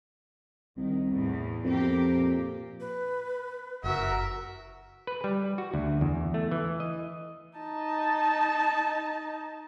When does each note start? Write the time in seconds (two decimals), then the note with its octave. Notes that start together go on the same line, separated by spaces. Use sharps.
0.77 C2 D#3
1.11 E2 A2
1.64 F2 C4 G4 A#4
2.17 A#2
2.80 B4
3.84 F#1 F#4 A#4 E5
5.07 B4
5.24 G3
5.58 F#4
5.74 D2
6.01 E2
6.34 A3
6.51 E3
6.80 D#5
7.58 D#4 A5